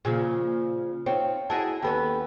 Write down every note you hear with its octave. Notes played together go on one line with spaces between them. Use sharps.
A#2 C#3 F3 G#4
C4 D#4 F4 C#5
E4 F#4 G#4 D#5 A5
D#2 B3 C#4 G4 A4 B5